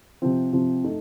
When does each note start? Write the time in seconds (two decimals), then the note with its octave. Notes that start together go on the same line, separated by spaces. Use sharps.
0.22 C3 F3 C4
0.53 C3 F3 C4
0.84 A3 D#4